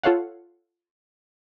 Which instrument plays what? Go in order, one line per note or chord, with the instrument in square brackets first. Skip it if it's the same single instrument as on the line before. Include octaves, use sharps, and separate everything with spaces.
[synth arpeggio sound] F4 A4 C#5 F5 F#5